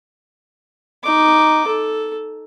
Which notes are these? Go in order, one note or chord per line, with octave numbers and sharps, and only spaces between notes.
D#4 D6
A4